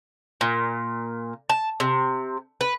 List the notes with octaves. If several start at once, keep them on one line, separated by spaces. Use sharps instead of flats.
A#2
A5
C3
B4